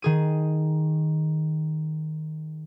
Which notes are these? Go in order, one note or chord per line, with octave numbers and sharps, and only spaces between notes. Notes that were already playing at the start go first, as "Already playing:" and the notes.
D#3 G#4 D#7